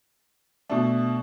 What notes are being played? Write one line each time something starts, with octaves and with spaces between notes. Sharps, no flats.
B2 A3 D4